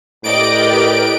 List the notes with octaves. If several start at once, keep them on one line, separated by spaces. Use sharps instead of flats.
A2 G4 A#4 B4 D5 D#5 G5 D7